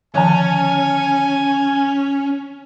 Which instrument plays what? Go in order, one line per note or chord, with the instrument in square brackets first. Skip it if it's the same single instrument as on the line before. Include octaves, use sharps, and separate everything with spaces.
[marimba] D3 D#3 F3 [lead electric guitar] C#4 [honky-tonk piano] C#5 A5 [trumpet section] G#5